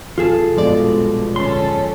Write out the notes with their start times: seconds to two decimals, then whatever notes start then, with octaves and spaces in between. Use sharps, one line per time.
0.18 F1 F#2 E3 F4 G#4 A4
0.57 A#1 E2 G2 B2 F3 G#3 D5
1.36 D1 F2 C#4 A4 C6